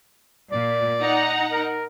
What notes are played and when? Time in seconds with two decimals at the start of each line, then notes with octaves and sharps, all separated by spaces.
0.52 A#2 D5
1.00 D#4 F#5 A#5
1.51 A#4